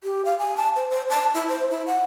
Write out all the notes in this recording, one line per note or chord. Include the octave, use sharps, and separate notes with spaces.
G4
F5
G#5
A5
C5
C5
A5
E4
C5
E4
F#5